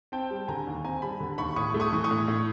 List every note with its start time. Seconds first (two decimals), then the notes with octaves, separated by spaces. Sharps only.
0.12 C4 G5 A5
0.31 G3
0.48 D3 G#5 A#5
0.67 D#2
0.84 C4 G#5 A#5
1.02 G3 A5 B5
1.20 D3
1.38 D#2 B5 C#6
1.56 A2 C#6 D#6
1.74 A3
1.80 C#6 D#6
1.93 E3
2.04 C#6 D#6
2.11 A2
2.28 A2